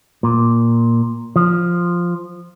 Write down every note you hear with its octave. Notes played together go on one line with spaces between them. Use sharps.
A#2
F3